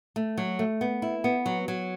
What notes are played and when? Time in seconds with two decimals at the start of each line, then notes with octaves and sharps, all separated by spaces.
0.16 A3
0.38 F#3
0.59 A3
0.81 B3
1.02 E4
1.24 B3
1.46 F#3
1.68 F#3